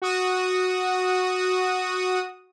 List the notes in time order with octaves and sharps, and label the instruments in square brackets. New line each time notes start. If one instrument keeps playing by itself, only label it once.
[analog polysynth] F#4 D#6